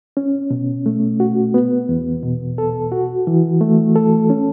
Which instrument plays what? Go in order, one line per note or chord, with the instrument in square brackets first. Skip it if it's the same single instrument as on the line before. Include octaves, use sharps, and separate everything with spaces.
[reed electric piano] C#4
B2
A3
F#4
B3
E2
B2
A4
F#4
E3
A3
A4
C#4